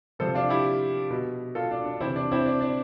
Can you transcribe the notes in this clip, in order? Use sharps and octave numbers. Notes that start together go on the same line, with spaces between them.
C3 F3 A4 C5
D4 F4
E4 G4
B2
F4 A4
D4
D4
C3 E3 C4 E4
D4
C4 E4
D4
D4